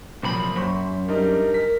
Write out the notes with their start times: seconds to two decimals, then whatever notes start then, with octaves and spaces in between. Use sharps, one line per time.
0.23 C2 A#2 F3 F#3 B5
0.56 F#2 C5 B5 C#6
1.08 G3 D4 D#4 A#4
1.54 A#4 B6